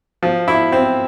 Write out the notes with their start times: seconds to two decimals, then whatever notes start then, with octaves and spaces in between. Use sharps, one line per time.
0.23 F3
0.48 E4
0.72 C4